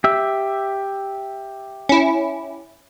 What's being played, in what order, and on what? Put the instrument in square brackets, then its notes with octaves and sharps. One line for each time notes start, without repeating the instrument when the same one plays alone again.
[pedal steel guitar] G4 E5
[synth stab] C#4 E4